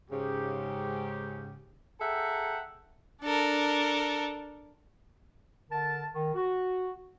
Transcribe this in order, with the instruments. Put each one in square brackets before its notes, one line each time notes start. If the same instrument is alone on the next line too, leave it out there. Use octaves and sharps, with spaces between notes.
[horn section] G#2 C#3 G4
G#4 A4 E5 F#5 G5 A#5
[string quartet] D4 A4 A#4
[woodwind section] D3 A#4 A5
D#3
F#4